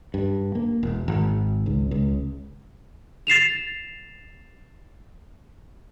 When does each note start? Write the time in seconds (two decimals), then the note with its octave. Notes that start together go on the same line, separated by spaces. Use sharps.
0.14 G2
0.55 A#3
0.83 E1
1.08 G#1
1.66 C#2
1.91 C#2
3.27 A6 C7 E7 F7